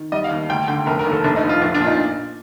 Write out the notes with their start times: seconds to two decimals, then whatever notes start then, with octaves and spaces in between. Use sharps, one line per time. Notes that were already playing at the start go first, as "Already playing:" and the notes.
Already playing: D#3
0.12 G3 D#5
0.24 F5
0.31 D#2
0.49 D2 G5
0.68 D3 G5
0.86 F1 A#4
0.99 A#4
1.06 D#2
1.11 A4
1.24 F1 D4
1.36 D#4
1.43 F2
1.49 F4
1.61 A#1 D4
1.75 D4
1.80 A#2 F4
1.87 D#4